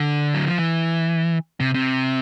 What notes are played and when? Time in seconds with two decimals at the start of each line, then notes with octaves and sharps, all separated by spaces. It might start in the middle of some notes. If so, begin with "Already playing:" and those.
Already playing: D3
0.34 F#3
0.46 F3
0.58 E3
1.60 C3
1.74 C3